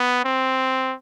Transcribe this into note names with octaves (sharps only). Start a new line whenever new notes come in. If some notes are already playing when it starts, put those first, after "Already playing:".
Already playing: B3
C4